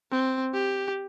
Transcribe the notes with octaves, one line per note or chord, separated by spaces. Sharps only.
C4
G4